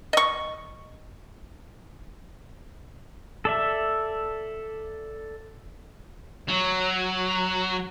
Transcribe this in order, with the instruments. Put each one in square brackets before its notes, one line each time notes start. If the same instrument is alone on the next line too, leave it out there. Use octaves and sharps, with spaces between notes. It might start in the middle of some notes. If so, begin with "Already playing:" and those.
[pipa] D#5 C#6
[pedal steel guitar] A4 D5 E5
[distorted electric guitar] F#3